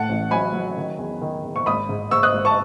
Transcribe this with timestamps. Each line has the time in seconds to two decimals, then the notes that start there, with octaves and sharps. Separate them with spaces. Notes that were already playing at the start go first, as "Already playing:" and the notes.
Already playing: A2 F#5 A5
0.09 A1
0.31 F#3 G#5 B5
0.54 F#3
0.77 D#3
0.99 E2
1.21 D#3
1.44 E2
1.56 C#6
1.66 G#1 B5 D#6
1.89 G#2
2.11 G#2 C#6 E6
2.23 D#6 F#6
2.34 G#1
2.45 A5 C#6